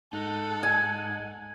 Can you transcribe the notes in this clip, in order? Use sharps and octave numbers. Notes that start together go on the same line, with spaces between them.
G#2 D#4 A4 F#5
G#5